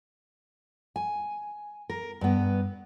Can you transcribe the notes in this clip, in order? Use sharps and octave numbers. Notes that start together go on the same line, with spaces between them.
G#5
A#4
G2 B3